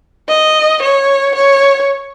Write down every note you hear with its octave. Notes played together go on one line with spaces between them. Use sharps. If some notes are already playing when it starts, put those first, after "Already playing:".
D#5
C#5
C#5